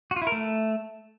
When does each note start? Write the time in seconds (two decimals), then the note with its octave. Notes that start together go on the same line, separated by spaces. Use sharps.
0.11 F#4
0.16 F4
0.22 E4
0.27 A#4
0.32 A3